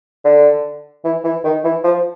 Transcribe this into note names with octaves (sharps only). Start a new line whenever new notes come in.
D3
E3
E3
D#3
E3
F3